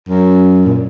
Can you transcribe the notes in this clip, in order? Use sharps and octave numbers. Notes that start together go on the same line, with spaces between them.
F#2
A#2